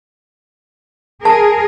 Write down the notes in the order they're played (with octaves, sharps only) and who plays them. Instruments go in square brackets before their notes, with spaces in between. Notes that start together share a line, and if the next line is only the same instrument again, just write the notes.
[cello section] G#4 A#4 [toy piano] A5